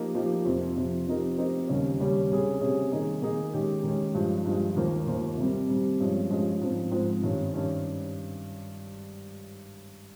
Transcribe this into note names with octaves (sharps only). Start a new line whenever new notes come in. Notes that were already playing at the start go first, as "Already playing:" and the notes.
Already playing: F3 A#3 D#4 G4
F3 A#3 D#4 G4
F2 C3 F3
F2 C3 F3
F3 C4 D#4 G4 A#4
F3 C4 D#4 G4 A#4
D#2 C#3 G3 C#4
D#2 C#3 G3 C#4
C3 G3 C#4 G#4
C3 G3 C#4 G#4
D#3 A#3 D#4 G#4
D#3 A#3 D#4 G#4
D#3 G#3 C#4 G4
D#3 G#3 C#4 G4
G2 F3 G#3
G2 F3 G#3
D#2 D#3 A#3 F4 C5
D#2 D#3 A#3 F4 C5
C3 G3 C4
C3 G3 C4
G2 F3 G#3 C#4
G2 F3 G#3 C#4
G#2 F3 C4
G#2 F3 C4
G2 D#3 G3 C#4
G2 D#3 G3 C#4